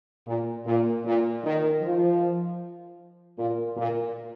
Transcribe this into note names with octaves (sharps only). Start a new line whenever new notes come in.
A#2
A#2
A#2
D#3
F3
A#2
A#2